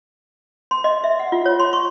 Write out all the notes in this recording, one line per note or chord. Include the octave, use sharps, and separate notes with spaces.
C6
D#5
E5
F#5
F4
C#5
C6
C#6